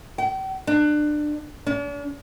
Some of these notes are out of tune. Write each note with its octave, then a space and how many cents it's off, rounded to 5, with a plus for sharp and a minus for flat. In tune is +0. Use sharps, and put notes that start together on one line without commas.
G5 -40
D4 +25
D4 -45